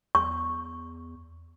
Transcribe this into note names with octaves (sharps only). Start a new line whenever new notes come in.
E2 C#6